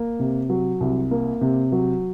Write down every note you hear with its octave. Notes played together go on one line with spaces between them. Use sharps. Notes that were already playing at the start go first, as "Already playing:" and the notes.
Already playing: A#3
C3
F#3
C2
A#3
C3
F#3